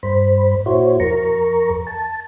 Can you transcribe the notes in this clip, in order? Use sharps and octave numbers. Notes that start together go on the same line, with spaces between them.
G2 C5 B5
A#2 E4 F#4 C5 C#5
F2 A#4 A#5 C#6
A5